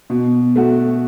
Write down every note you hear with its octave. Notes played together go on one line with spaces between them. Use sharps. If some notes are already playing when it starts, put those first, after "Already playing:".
B2
A3 F#4